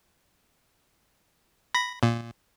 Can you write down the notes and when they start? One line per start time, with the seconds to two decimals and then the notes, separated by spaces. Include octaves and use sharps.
1.75 B5 A#6
2.03 A#2